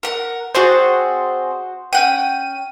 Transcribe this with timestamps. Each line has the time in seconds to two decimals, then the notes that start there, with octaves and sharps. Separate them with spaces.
0.03 A#4 F#5
0.55 C4 F#4 G#4 C5 D5
1.93 C#4 F#5 G5 D#7